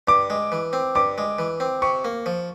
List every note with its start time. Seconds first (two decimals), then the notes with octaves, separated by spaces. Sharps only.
0.08 G2 D6
0.30 G#3
0.52 E3
0.73 C4
0.95 G2 D6
1.18 G#3
1.39 E3
1.60 C4
1.82 C3 C#6
2.05 A#3
2.26 F3